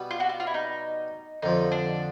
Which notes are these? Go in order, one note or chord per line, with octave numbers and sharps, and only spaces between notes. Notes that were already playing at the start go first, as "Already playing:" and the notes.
Already playing: B2 G3 B3
F4
F#4
F4
F4
E4
D#4
F2 D3 F3 D#4
D4